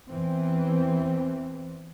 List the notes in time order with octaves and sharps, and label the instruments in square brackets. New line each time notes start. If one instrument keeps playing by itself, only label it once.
[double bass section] E2 E3 C4